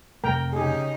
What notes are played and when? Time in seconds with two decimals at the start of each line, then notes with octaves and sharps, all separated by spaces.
0.24 F2 C3 A3 A#4 G5 A#5
0.53 C#3 D#4 G4 G#4